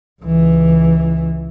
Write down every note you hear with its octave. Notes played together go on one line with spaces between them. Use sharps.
C#2 E3